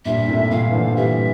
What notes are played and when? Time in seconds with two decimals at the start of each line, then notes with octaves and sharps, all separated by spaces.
0.05 G2 A#2 E5
0.28 A2 C3
0.51 A#2 D3 F5
0.69 E3
0.73 D3 F3
0.96 E3 G3 E5